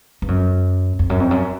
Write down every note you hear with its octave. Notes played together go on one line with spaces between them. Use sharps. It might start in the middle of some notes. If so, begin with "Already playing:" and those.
G2
F#2
F2
F#2
F2
F#2